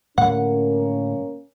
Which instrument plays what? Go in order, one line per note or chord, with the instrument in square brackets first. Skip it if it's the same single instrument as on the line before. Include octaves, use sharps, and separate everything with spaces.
[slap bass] A2 D3 G3 [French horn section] A#3 C#4 [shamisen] F#5